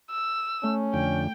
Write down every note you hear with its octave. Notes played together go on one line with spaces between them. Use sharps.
E6
A3 C#4
F2 D3 G5